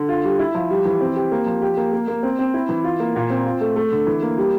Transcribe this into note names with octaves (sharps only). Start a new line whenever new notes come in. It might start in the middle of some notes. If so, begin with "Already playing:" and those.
Already playing: D3
F4
G3
E4
F3
G3
E3
C4
G4
A#3
F3
G4
A#3
A#3
A#3
C4
C4
E4
E3
F4
A#3
A#2
C4
F4
A3
A3
D3
E3
A#3
G3